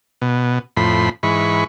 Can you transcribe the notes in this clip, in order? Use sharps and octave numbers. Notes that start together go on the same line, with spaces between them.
B2
F2 A2 B5 C6
G#2 E3 B5 C#6